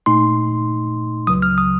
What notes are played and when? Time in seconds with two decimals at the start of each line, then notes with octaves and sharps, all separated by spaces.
0.06 A#2 A3 D#4 C6
1.27 C#2 C#3 F#3 D#6
1.42 F6
1.58 D#6